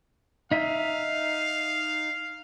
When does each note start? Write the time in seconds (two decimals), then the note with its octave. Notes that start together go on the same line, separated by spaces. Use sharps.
0.51 D#4 E5 F5